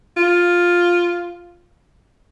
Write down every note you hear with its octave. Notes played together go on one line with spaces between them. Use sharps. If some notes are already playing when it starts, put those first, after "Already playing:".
F4